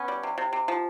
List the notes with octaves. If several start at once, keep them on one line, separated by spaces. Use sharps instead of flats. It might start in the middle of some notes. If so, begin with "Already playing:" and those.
Already playing: B3 C#4
G3
C3
C3
C3
F3